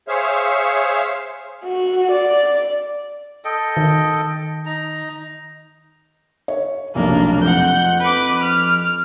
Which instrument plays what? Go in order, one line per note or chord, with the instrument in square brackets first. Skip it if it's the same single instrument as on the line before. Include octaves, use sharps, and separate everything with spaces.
[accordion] G#4 C5 C#5 E5 F5
[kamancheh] F#4
D5
[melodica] A4 D#5 G5
[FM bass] D#3
[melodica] D#4 A#5
[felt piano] C#5
[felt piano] F1 B1 [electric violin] A#3 D4
[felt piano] F2 [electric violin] F#5 G6
[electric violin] B4 D6
F6